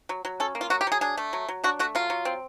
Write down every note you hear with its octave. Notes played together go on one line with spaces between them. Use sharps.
F#3
F#3
C#4 A4
A#3
F4
F#3 F#4
G4
F#3 G#4
D4 G#4
A3
F#3
F#3
D4 F#4
A3 F#4
F#3 F4
F#3
C4